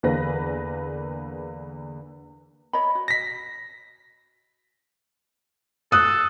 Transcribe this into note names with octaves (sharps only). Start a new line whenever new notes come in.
E2 D3 A#3 G#4 B4 A#6
C#5 D#5 B5
F#4
A#6 B6
A4 D#6 F#6